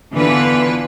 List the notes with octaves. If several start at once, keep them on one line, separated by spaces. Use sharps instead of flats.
D3 E3 B3 F4 B4